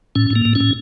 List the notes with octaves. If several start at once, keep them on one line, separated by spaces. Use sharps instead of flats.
A2 C#4
A2
A#3
A2
C#4
A2